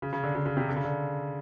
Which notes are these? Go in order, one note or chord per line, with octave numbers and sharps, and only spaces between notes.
C#3
C#3
D3
C#3
C#3
C3
D3
C#3
D3